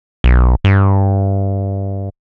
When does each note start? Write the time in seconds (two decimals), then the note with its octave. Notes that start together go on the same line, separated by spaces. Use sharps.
0.24 B1
0.64 G2